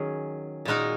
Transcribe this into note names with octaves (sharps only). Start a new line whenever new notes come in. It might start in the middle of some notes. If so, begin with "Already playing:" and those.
Already playing: D#3 F#3 C#4 G#4
A#2 G#3 D#4 F#4 A#4